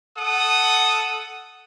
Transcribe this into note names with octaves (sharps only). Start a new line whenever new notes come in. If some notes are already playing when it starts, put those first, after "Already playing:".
A4 F#5 D#6